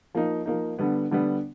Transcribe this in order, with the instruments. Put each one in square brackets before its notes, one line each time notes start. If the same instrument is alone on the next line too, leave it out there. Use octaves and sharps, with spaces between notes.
[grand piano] F3 A#3 D#4
F3 A#3 D#4
D3 G3 B3
D3 G3 B3